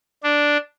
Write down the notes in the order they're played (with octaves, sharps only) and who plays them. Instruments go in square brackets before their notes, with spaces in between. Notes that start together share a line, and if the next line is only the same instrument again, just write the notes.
[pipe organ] D4